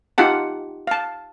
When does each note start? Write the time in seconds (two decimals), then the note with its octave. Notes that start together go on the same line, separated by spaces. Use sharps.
0.18 D#4 F4 G4 F#5 A5
0.87 F5 A5